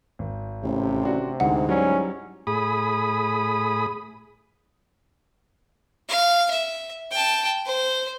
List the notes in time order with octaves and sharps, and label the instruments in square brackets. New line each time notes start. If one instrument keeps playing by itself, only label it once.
[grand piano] G#1
[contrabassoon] A1 [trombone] C3
[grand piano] D4 F#4
[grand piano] D2 D3 E3 [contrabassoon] G#2 [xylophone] F#5
[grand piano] F#3 G3 E4 [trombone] C#4
[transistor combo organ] A2 G#4 B5 D#6
[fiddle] F5
E5
G5 A5
C5